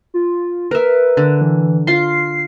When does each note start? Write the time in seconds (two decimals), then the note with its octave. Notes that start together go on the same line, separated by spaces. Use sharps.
0.14 F4
0.71 A#4 B4 E5
1.17 D3
1.41 E3
1.87 F4 C6 C7